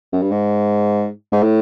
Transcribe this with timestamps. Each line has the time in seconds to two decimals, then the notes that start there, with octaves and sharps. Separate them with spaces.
0.12 F#2
0.22 G2
0.31 G#2
1.32 G#2
1.43 A2